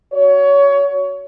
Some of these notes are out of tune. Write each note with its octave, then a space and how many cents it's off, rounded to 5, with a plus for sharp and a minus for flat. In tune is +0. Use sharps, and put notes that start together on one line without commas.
F#4 +0 C#5 +25